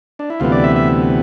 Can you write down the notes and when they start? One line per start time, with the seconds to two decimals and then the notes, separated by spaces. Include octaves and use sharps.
0.19 D4
0.30 E4
0.40 D2 C3 E3 B3 F4
0.52 D5
0.64 E5
0.76 E5